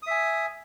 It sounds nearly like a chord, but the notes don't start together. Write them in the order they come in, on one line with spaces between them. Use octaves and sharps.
D#6 E5 G#5